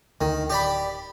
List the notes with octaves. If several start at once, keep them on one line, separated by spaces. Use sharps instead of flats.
D2 D#3
D1 G4 D5 B5